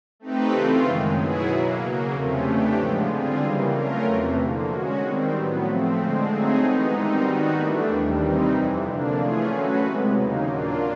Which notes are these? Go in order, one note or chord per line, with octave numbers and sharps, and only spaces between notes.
A3 C4 D#4 G4 B4
C#3 E3 A3 C4 F4
F#2 D#3 G#3
B2 F#3 B3 E4 G#4
B2 F#3 A#3
C#3 F#3 A#3
E2 C3 F3 A3 C#4
C#3 E3 A3 D4 G4
G#2 F3 G#3 B3
D3 G3 C4 F4 G#4
C#3 E3 G3 A#3
F#3 A3 C#4 F4 A#4
E2 C3 E3 A3
D3 F3 A#3
G#3 C#4 F#4
D#3 G3 C4
A2 F#3 B3
F3 A3 C4
D3 F3 G#3 C4
F#3 A3 C4 D#4 G#4
E3 G#3 B3 D#4
G#2 D#3 G3 C4 D#4
D#3 G3 B3 D#4 F#4
E3 A3 D4
D#2 D#3 G3
C3 E3 G3 C4 D#4
F2 C3 E3
D3 F3 A#3 D4
E3 A3 C#4 F4 G#4
F#3 A3 C#4 F#4 B4
C3 E3 G#3 B3
D#2 C#3 F#3 A#3 D#4
A#2 F#3 A#3 D4 F4